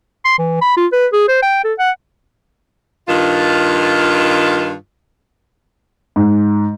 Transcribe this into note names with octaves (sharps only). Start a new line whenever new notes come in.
C6
E3
B5
F4
B4
G#4
C5
G5
A4
F#5
G2 D#3 F4
G#2